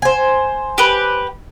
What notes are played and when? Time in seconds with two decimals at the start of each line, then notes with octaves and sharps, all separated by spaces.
0.02 C5 G#5
0.78 G4 B4